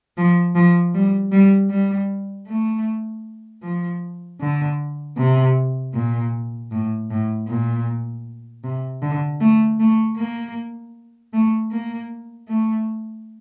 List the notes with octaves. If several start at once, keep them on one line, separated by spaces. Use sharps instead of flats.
F3
F3
G3
G3
G3
A3
F3
D3
C3
A#2
A2
A2
A#2
C3
D3
A3
A3
A#3
A3
A#3
A3